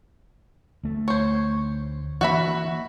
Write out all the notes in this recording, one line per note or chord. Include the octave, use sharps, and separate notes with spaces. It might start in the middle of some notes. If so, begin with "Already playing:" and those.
D2 A3
C5 C#5
E3 A#3 F#4 E5 B5